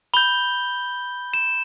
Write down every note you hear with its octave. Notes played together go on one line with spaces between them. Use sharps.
B5 G6 G7
E7